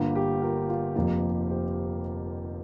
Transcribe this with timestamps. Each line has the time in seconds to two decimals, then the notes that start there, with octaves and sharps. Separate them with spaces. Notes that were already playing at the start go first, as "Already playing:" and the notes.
Already playing: G1 G2 D3 A#3 F4
0.15 G4
0.42 F4 A#4
0.69 F4
0.95 F1 F2 F3 A#3 G4
1.49 G4 C5